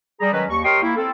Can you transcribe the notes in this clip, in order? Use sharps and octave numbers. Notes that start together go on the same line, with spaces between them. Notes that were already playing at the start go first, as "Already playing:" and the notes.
G3 G#4 A#5
D#3 F#3 G#3 C#4 B4
D#2 C#6
G4 A#4 C#5 D#5 G5 C6
A#3 E4
C4 A4